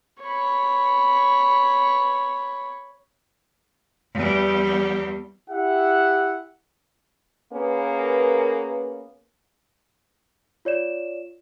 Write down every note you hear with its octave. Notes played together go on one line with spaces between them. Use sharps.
C#5 B5
E2 G3
E4 G4 E5 F#5
A#3 B3 C#4 G#4 A#4 B4
F4 C#5 D5 E7